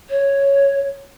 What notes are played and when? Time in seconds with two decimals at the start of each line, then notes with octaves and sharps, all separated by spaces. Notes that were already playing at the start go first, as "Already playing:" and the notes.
0.09 C#5